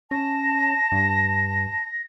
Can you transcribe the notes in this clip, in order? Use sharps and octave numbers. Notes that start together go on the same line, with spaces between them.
C#4 A5 A#6
G2